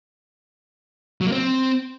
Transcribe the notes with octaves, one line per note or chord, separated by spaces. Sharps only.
F#3
A#3
C4